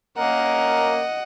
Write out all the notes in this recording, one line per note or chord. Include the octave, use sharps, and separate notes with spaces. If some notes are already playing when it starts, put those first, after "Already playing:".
A#3 C#4 A#4 D#5 F#5